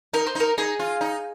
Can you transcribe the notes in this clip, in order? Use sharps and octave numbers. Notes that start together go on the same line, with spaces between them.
D#4 A#4
C5
D#4 A#4
D#4 G#4
F4
D#4